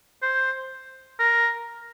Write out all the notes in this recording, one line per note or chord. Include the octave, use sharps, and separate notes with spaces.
C5
A#4